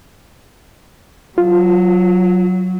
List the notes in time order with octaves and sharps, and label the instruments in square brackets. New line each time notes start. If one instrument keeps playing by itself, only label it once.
[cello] F#3 [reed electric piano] F4